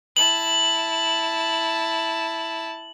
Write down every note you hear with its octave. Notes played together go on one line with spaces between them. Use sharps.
E4 A5 F#7